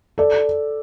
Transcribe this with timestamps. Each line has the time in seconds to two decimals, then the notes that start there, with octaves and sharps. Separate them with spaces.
0.18 A4 D5